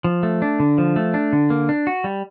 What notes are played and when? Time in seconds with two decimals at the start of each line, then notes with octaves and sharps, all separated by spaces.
0.04 F3
0.23 A3
0.42 D4
0.60 D3
0.78 F3
0.96 A3
1.14 D4
1.33 D3
1.50 A#3
1.69 D4
1.87 F#4
2.04 G3